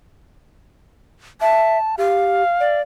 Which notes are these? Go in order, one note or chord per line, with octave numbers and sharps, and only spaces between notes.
E5 A5
G4 F5
D5